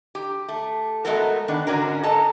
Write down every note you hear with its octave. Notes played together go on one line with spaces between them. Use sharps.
G4
A3
G#3 A3 B3 F#4 A4 A#4
D#3 B3 D4
G#2 D3 C#4 F#4 A#4
A4 D#5 A5 A#5